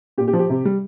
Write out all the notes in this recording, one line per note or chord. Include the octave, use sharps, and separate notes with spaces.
A#2 G4
G4
F3
G4
C3
G3